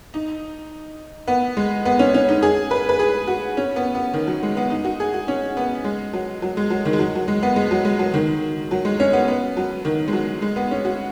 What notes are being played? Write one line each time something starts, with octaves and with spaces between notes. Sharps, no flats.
D#4
B3
G#3
B3
C#4
C#4
D#4
G#4
B4
B4
G#4
F#4
C#4
B3
B3
D#3
F#3
G#3
B3
D#4
F#4
G#4
F#4
C#4
B3
G#3
F#3
F#3
G#3
F#3
D#3
G#3
F#3
F#3
G#3
B3
G#3
F#3
G#3
F#3
D#3
F#3
G#3
C#4
B3
B3
F#3
D#3
G#3
F#3
G#3
B3
C#4
F#4